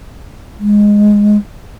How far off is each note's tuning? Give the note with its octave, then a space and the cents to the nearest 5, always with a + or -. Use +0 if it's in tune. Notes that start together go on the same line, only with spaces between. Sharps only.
G#3 -5